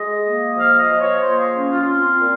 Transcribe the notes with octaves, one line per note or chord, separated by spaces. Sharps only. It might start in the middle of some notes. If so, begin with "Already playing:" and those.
Already playing: G#3 D#5
A#3
F3 F5
D#5
F3
C#5
A#3 C5
G#4
C#4
F4
C4 F4
A#2